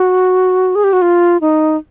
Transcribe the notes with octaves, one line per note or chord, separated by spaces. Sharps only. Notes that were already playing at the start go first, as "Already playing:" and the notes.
Already playing: F#4
G#4
G4
F#4
F4
D#4